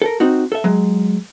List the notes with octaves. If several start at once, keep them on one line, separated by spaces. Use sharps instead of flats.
A4 A#4
C4 D#4 F#4
A4 E5
F#3 G#3